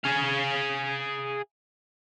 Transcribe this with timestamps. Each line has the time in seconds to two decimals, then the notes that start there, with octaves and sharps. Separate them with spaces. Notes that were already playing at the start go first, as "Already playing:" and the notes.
0.04 G#4 F5